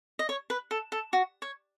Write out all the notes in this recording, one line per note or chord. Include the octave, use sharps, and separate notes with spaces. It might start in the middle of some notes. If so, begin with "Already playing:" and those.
D#5
C#5
B4
A4
A4
F#4
C#5